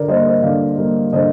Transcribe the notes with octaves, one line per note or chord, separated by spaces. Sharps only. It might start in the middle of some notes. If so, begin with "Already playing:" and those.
Already playing: D3 A#4 D5
G3 A#3 C5 D#5
C5 D#5
D3 D5 F5
G3 A#3
D3 C5 D#5